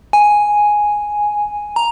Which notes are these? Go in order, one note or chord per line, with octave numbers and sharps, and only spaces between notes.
G#5
A#5